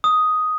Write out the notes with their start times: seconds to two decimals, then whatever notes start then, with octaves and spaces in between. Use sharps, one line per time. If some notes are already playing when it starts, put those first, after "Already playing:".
0.04 D#6